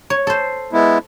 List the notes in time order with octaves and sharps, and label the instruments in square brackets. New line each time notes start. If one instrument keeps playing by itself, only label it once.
[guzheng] C#5
A4 C5
[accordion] G#3 B3 E4